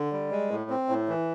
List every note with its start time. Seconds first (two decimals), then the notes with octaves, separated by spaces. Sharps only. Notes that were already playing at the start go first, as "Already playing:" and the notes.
Already playing: D3
0.13 G3
0.31 G#3
0.51 A2
0.70 C4
0.89 A2
1.09 E3